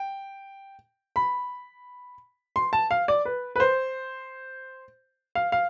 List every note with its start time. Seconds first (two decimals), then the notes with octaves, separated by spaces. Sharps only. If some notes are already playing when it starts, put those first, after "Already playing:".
Already playing: G5
1.16 B5
2.56 C6
2.73 A5
2.91 F5
3.08 D5
3.25 B4
3.56 B4
3.60 C5
5.35 F5
5.52 F5